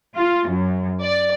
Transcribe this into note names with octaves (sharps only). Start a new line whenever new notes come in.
F4
F#2
D5